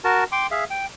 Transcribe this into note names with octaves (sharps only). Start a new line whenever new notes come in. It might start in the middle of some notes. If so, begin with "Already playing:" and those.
F#4 A#4 A5
G5 C6 D6
G#4 E5 F5
G5